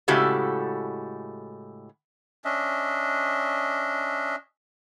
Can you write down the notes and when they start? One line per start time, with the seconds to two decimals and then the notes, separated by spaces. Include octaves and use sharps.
0.08 A2 C#3 G#3 F#4 G4 A4
2.45 C#4 D4 D#5 E5